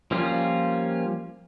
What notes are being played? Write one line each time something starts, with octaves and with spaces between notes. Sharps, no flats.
F3 G3 A#3 C#4 F4